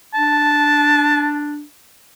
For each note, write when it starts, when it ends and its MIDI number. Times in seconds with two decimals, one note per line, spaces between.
0.14 1.63 62
0.14 1.37 81